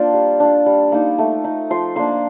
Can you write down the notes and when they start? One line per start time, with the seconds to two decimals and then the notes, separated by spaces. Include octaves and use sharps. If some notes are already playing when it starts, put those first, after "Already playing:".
Already playing: A#3 D4 F4 C5 D5
0.14 G3
0.40 D4 F4
0.66 G3
0.92 A#3 D#4
1.18 A3
1.44 D#4
1.70 F3 C6
1.96 A#3 D4 C6